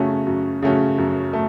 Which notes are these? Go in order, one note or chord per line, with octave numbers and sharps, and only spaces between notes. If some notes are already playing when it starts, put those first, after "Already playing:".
Already playing: F#2 C#3 A3 C#4 F#4
F#2
C#3 A3 C#4 F#4
F#2
A3